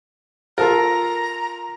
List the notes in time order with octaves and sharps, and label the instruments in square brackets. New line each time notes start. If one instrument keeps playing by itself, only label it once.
[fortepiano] F4 A4 A#4 [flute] A#5